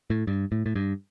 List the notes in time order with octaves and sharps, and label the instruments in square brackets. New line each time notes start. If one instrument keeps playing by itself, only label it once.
[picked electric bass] A2
G2
A2
A2
G2